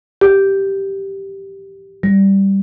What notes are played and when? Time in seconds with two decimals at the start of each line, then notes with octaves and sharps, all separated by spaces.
0.21 G4
2.03 G3